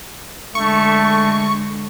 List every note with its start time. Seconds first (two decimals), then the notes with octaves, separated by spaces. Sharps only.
0.55 D3 G#3 A3 C#6